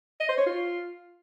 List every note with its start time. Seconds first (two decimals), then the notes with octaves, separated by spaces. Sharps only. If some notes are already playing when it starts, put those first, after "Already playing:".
0.20 D#5
0.29 C5
0.37 C#5
0.46 F4